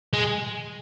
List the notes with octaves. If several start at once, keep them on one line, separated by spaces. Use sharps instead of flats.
G#3